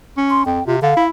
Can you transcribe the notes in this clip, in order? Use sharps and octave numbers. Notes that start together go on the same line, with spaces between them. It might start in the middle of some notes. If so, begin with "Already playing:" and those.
C#4
C6
F2 G5
C3 F4
D3 F5
E4